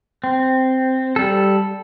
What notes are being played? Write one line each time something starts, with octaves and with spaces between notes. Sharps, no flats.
C4
G3 A4